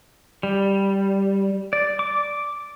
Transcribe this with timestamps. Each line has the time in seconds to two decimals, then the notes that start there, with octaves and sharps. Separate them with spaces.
0.43 G3
1.73 D5
1.99 D6